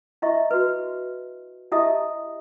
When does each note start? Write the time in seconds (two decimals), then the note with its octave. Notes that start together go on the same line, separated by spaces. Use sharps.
0.22 E4 D#5 E5 C#6
0.51 F#4 B4
1.72 E4 G4 D#5 E5 A5 D#6